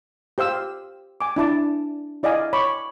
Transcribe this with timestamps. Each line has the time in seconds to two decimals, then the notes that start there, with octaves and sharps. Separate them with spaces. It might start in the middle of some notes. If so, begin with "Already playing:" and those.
0.38 G4 C5 F5 E6
1.21 G#5 D6
1.36 D4 E4 A5 D6
2.23 E4 D5 D#5 F5 G#5
2.53 C#5 B5 C#6 D6